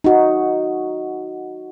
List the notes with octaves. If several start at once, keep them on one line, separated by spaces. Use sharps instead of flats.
D#4 F#4